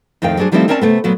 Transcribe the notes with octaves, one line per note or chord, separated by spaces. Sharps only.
F2 A2 D#3 F5 G5
F#3 G3 D4 G#4 C5
D#3 F3 G3 A3 C4 E4
C4 C#4 A#4 D5 G5 A5
C3 A3 B3
A#2 F#3 B3